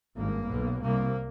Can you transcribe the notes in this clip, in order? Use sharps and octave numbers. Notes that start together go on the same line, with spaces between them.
G#1 G2 A#3
B1 B2
C2 C3 A#3